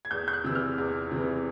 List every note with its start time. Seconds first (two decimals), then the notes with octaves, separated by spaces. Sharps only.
0.05 G#6
0.11 E2 G6
0.28 G6
0.33 F#6
0.44 C3 E3 E6
0.55 F6
0.78 E2
1.12 C3 E3